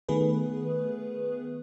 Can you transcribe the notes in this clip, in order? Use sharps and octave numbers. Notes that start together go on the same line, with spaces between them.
D#3 A3 B3 G#4 B4